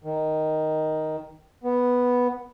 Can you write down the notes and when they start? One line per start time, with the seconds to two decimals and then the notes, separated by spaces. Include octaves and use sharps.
0.04 D#3
1.64 B3